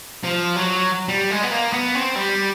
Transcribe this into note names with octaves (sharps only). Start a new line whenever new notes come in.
F3
F#3
G3
G#3
B3
A#3
B3
C4
G3